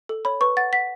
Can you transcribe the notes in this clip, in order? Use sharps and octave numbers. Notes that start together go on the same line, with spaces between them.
A4
C#5 B5
B4 C#6
F#5 A6
F#5 B6